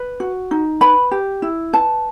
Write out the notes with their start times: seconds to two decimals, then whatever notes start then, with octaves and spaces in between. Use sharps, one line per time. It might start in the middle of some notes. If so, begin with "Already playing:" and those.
Already playing: B4
0.20 F#4
0.51 D#4
0.81 B4 B5
1.11 G4
1.42 E4
1.73 B4 A5